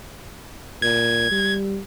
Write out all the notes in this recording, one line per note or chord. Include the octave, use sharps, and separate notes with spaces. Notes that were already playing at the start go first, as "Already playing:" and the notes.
A#2 G#6
G3